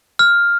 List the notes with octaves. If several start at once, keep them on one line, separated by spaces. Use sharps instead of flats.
F6